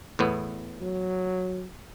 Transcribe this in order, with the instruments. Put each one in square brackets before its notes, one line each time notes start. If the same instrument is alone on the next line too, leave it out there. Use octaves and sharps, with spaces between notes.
[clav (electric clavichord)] E2 A2 B3
[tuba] F#3